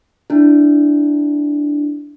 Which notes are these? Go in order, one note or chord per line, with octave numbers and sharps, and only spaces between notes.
D4 E4